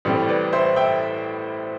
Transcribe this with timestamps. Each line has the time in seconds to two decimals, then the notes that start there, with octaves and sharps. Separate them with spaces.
0.05 A1 A2 G3 C4
0.29 B4 D5
0.53 C5 E5
0.76 E5 G5